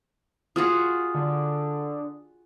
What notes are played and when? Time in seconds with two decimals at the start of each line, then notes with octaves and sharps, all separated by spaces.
0.56 F4 F#4 G#4 D#6
1.15 D3